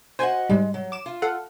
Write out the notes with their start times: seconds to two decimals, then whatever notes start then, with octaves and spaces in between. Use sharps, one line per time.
0.19 F#4 C5 D#5 F#5 G#5
0.49 G#2 G3 G#3
0.74 F#3
0.92 D6 E7
1.06 F4
1.22 A4 F5 F#5